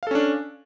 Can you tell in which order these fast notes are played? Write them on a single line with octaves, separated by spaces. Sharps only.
F5 A4 C#4 D4